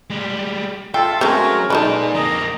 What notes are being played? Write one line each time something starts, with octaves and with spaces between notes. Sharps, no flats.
G3 G#3
F4 A4 E5 F5 G5
F#3 G#3 A3 C4 C#4 F#4 A#4 C#5
G#3 A#3 D#4 A4 B4 D5
F2 A#3 D#5 A#5